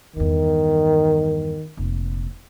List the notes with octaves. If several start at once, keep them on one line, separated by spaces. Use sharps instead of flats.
E2 G2 D#3
F1 A#2